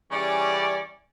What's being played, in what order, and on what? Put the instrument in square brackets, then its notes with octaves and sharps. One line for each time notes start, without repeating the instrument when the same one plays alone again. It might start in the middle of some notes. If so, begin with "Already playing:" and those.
[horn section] C#3 E3 G3 C#4 D5